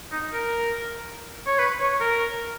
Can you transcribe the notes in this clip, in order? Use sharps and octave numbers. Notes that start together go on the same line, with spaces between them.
D#4
A#4
C#5
B4
C#5
A#4